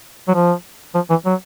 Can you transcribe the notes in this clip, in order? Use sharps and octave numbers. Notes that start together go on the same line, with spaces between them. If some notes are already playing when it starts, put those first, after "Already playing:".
F#3
F3
F3
E3
F#3